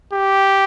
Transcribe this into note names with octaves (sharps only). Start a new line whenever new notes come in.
G4